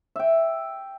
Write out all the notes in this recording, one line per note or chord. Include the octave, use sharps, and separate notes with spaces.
E5 G5